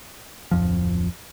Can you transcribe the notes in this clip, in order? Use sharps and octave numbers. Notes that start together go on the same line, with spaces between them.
D1 F2 F3